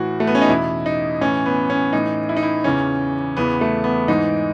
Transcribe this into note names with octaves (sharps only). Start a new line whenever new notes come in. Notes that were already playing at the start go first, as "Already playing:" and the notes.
Already playing: A2 E3 F#4
A3
B3
C#4
D#4
E2 B2 E4
D#4
A2 E3 C#4
B3
C#4
A2 E3 D#4
E4
D#4
E4
E2 C#3 E3 C#4
E2 C#3 E3 B3
A3
B3
G#2 E3 D#4